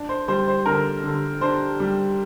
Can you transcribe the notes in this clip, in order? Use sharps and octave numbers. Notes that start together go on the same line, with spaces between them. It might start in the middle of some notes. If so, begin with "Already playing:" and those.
Already playing: D4
C5
G3 C5
C5
D3 A#4
D3
D4 C5
G3